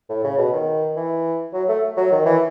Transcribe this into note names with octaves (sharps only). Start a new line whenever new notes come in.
A2
C#3
B2
D#3
E3
F#3
A3
F#3
D#3
E3